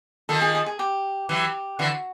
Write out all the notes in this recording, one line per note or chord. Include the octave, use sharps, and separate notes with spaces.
D#3 F3 A4
G#4
G#4
G#4
G4
E3 F#3 G4
D3 E3 F#4